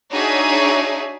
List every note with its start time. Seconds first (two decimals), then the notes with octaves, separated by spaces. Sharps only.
0.11 D4 D#4 F#4 G#4 C#5 E5